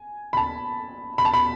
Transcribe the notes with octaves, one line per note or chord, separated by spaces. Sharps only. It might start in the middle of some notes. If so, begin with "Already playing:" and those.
Already playing: G#5
B5
A5
B5
A5
B5